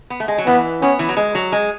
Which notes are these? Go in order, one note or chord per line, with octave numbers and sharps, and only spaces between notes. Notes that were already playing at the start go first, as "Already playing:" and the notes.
B3
A3
G#3
F#3
E3 B3
B3 C#4
E3
F#3
G#3
F#3
G#3